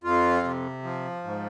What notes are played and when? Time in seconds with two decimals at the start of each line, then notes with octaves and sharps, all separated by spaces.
0.04 F2 F4
0.44 C3
0.83 F3
1.24 G#2